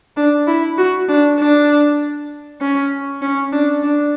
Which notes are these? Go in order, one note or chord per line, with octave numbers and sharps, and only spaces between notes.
D4
E4
F#4
D4
D4
C#4
C#4
D4
D4